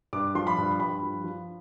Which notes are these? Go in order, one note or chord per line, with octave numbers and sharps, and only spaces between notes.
G2 D6
F3 C6
B5
G2
G2 B5
F3
F3